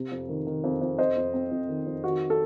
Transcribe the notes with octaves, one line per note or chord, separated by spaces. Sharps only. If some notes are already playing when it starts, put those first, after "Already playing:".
Already playing: C3
F2
D#3
D#3
F2
F2
F2 C5 D#5
F2
C4
F2
D#3
F2
D#3 F#4
A4